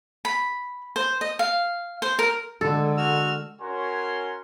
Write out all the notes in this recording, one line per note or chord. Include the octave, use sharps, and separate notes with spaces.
B5
C5
D#5
F5
C5
A#4
D3 G#3 A4
F#4 E6 F6
C#4 F#4 A#4 C#5 G#5 C6